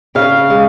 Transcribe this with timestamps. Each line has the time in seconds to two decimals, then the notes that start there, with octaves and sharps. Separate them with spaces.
0.15 C#3 F5
0.50 G#3